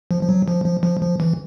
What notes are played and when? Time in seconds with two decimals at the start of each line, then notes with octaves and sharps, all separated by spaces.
0.11 F3
0.23 F3
0.29 F#3
0.48 F3
0.65 F3
0.83 F3
1.02 F3
1.20 E3